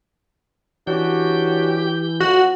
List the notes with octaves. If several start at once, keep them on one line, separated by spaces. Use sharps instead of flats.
E3 C#4 D4 F#4 G4 G6
F2 F#4